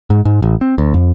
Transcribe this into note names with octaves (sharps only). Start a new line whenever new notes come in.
G#2
G#2
A1
C4
D2
F2